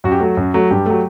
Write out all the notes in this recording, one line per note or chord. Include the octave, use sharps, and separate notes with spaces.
F#2 F#4
G4
F#3 A3 F#4
F#2
F#3 A3
G2 G4
F#3 A3